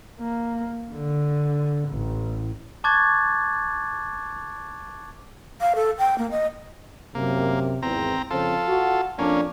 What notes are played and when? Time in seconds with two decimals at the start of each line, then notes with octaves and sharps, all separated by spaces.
0.20 A#3
0.92 D3
1.89 A1
2.84 A5 C#6 D6 F#6 G#6 A6
5.61 F5
5.75 A4
5.99 G5
6.18 A#3
6.31 D#5
7.15 F#2 C3 A#3
7.83 G#1 E2 C4 A#5
8.30 F2 C#3 C4 F4 A4
8.68 F#4
9.18 F2 A#3 C#4 D4